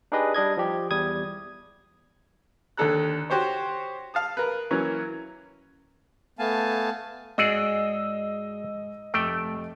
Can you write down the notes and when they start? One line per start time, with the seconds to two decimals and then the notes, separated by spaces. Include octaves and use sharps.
0.12 D4 D#4 G4 G#4 B4 D#5
0.34 G3 D4 D#5 G#6
0.57 F3 G4
0.91 E2 G3 D#6 G#6
2.77 D#2 D3 D4 A4 A#5 F#6
3.30 F#4 G4 C5 C#5
4.14 F5 A5 D#6
4.37 A#4 B4
4.71 E3 F#3 A#3 C#4
6.39 A3 B3 F5 G#5 A5
7.38 G#2 F#4 G#4 D5 D#5 E6 C7
9.14 F1 A3 G5 D6 D7